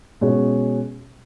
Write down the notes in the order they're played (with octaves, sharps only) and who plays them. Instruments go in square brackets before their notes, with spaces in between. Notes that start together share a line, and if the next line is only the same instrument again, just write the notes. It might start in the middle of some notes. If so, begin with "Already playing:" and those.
[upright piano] B2 G#3 C#4